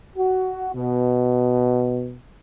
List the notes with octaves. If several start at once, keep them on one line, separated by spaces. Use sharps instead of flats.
F#4
B2